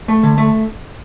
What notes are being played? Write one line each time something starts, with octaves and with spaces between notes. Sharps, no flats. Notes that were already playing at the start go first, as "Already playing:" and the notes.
A3
D3
A3